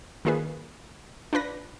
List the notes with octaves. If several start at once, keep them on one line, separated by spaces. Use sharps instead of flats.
D#3 A#3 F4 G#4 B4
D4 F4 B4 A#6